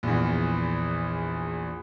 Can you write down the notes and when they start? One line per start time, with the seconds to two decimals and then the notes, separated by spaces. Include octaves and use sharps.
0.03 A#1 E2